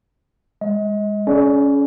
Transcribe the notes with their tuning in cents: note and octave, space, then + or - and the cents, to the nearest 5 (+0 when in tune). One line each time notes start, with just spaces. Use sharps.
G#3 -20 D#5 +35
C#4 +15 G#4 +40 D5 -5